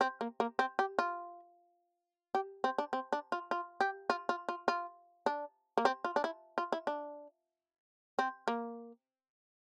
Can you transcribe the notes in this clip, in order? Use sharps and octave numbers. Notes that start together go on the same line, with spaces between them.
C4
A#3
A#3
C4
G4
F4
G4
C4
D4
C4
D4
F4
F4
G4
F4
F4
F4
F4
D4
A#3
C4
F4
D4
E4
F4
E4
D4
C4
A#3